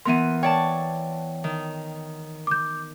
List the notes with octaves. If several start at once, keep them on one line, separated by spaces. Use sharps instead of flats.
E3 B3 A#4 C6 D#7
C#5 D5 G5 A5
D#3
D6 G6